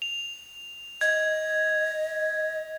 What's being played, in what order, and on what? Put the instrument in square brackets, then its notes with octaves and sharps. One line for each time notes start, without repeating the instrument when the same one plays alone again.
[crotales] F7
[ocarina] D#5 [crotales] G#6